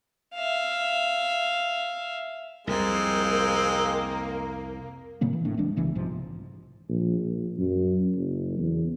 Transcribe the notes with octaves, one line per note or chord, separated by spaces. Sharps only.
E5 F5
C2 F2 G#3 A#3 C4
A2 C#3 A#3 C4
E3
F1 A2 A3 D4
D1 E3 G#3 D4
C2 C#3 E3 B3
B1 G#2 C3 F3
A#1
A#1
F#2
F#1
E2